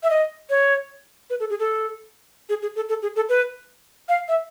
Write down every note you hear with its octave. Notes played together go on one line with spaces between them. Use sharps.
E5
D#5
C#5
B4
A4
G#4
A4
G#4
G#4
A4
A4
G#4
A4
B4
F5
E5